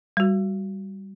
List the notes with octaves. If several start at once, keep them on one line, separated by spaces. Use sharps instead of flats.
G3 F#4